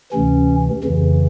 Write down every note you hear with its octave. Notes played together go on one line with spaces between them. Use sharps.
D2 C3 E3 C#4
F2 C#3 E3